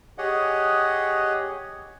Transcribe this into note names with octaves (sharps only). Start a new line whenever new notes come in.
G4 G#4 C#5 D#5 F#5